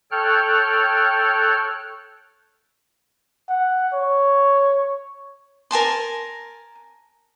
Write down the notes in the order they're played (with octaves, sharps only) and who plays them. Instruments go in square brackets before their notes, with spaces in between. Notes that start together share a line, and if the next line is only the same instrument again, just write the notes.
[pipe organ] A4 C#5 G5 F6 F#6
[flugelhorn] F#5
C#5
[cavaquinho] A#4 G#5 A5 C6